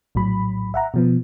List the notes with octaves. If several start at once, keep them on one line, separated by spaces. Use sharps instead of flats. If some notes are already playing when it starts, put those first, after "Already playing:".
A#1 A2 F#3 B5
E5 F#5 A#5
B2 F3 B3